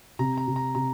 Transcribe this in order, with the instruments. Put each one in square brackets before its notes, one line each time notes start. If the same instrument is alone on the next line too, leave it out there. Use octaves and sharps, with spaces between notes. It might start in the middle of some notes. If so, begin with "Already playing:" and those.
[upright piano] C3 [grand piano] A#5
[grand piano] A#5
[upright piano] C3
[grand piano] A#5
[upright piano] C3 [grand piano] A#5